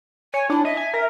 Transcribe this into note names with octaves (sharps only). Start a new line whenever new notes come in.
C#5 G#5
D4 E4
D#5 E5
G#5
A#4